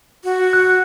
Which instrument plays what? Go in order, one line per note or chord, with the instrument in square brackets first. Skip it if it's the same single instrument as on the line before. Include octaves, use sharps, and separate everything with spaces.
[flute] F#4
[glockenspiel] F#6